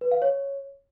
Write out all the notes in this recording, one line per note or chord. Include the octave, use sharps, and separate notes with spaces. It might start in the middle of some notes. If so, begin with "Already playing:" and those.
B4
F5
C#5